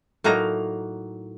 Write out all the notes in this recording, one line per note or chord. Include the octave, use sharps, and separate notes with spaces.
A2 F#3 A#3 D#4 A#5